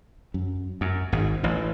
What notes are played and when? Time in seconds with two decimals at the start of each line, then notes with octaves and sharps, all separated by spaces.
0.34 F#2
0.81 F#2
1.12 G#1 G#2
1.43 A1 A2